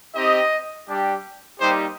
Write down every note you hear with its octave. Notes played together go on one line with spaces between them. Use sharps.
C4 D#4 G4 D#5
G3 D4 G4
G3 A#3 D#4 G4 C5